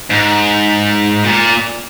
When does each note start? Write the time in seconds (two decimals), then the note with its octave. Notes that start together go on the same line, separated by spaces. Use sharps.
0.10 G#2
1.24 A#2